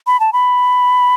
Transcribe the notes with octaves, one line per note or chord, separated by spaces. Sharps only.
B5
A5
B5